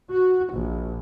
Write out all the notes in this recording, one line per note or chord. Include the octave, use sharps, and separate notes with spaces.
F#4
A#1